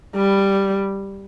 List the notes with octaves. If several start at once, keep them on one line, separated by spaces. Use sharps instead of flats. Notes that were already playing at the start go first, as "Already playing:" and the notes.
G3